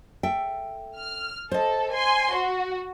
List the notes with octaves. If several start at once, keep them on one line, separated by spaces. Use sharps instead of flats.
A4 E5 G5
F6
A4 C5 D#5
G#5 C6
F#4